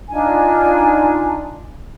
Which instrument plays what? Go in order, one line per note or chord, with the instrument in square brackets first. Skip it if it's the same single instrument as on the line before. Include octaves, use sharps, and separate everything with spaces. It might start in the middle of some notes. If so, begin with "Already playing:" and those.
[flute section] D4 D#4 F4 G#5